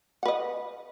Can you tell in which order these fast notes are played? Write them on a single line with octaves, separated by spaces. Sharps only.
F#5 B4 D#5